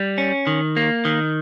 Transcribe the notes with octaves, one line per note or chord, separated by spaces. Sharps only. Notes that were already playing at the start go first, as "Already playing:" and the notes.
Already playing: G3
C#4
D#3
A#3
D#3